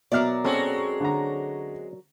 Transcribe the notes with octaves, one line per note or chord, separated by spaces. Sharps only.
B2 F#3 A#4 D5 E5 F6
G#3 C4 C#4 F#4 A4
D3 A#5